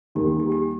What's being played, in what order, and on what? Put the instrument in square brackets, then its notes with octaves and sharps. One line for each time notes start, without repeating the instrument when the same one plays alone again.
[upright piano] D#2 D#3 G3 D#4 [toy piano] G4
[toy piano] G4
G4